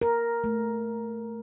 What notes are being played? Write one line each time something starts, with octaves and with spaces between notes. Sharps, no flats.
A#4
A3